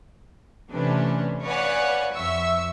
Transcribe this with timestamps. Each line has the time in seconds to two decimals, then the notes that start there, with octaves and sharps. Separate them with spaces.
0.71 C3 E3 A3 C#4 D4 B4
1.43 B4 C#5 D5 F5 F#5 G#5
2.13 F2 E5 C#6 E6